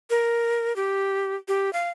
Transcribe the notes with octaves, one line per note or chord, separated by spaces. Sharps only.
A#4
G4
G4
F5